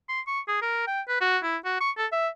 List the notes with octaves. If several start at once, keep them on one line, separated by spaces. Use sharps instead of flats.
C6
C#6
G#4
A#4
G5
B4
F#4
E4
F#4
C#6
A4
E5